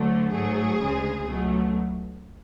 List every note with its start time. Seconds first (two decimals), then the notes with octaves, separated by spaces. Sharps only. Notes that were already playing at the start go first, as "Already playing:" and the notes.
Already playing: D2 D3 F#3 A3
0.31 G#2 F#3 A3 G#4
0.79 D2 C#3 G#3
1.27 C#2 B2 F#3 A3